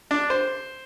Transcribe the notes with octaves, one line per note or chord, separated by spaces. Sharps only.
D4
C5